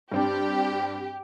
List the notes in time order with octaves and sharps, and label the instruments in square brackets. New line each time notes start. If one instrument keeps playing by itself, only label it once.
[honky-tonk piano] G2 C4 D4 [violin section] G4